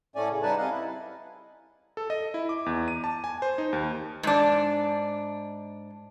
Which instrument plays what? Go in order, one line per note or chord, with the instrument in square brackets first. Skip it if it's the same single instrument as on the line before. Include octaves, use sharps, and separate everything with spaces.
[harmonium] A2 A3 C#4 D5 G#5
C#3
G3 D#4 B4 F#5 G#5 A5
C3 D#5 F5 F#5
E4
[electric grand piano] A4
D#5
E4
D6
E2
D#7
A5
G#5
C5
D#4
D#2
[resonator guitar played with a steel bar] G#2 D4